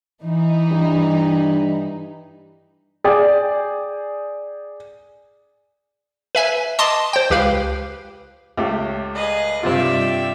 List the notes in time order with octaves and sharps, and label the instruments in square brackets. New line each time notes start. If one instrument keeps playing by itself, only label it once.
[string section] E3 D#4
[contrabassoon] G2
[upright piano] G#4 D5 G5
[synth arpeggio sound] B4 E5 G#5
D#5 A5 C6 D6 D#6
C5 G5
C#2 G4 B4 F5
[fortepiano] C#2 A3 G4
[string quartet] G#4 B4 D#5
[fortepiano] G2 C3 F4 [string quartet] D5 E5 G5